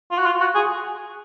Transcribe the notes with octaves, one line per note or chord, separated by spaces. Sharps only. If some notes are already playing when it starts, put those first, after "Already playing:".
F4
F#4
F4
F#4
G#4